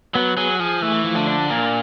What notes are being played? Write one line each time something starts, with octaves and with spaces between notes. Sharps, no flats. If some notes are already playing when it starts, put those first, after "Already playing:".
F#3 B3
F#3 G#4
F3 G#4
E3 A3
F3
D3
D4
A#2 A#4